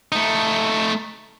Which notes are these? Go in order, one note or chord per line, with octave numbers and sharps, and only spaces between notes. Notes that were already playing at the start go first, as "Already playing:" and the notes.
A3 D#4